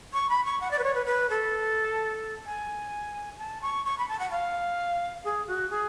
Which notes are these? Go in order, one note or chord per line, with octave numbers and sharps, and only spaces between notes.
C#6
B5
C#6
F#5
D5
B4
C#5
B4
B4
A4
G#5
A5
C#6
C#6
B5
A5
F#5
F5
G#4
F#4
G#4